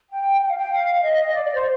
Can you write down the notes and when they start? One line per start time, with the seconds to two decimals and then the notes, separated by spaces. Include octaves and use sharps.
0.10 G5
0.41 G5
0.49 F5
0.57 G5
0.72 F5
1.03 D#5
1.33 D5
1.44 D5
1.54 C5